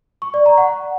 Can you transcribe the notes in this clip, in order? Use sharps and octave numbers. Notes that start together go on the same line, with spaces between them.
C#6
D5
A#5
F#5